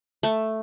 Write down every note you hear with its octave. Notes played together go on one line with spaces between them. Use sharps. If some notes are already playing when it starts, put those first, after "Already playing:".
A3